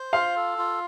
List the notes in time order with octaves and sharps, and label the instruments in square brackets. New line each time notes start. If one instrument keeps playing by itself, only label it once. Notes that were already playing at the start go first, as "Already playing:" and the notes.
Already playing: [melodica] C5
[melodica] F4 [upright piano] F5
[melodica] A4
F4